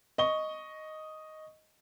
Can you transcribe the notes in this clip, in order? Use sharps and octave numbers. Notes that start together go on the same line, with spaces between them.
D#5 C#6 G7